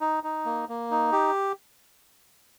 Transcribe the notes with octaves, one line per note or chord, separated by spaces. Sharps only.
D#4
D#4
A#3
A#3
D#4
G4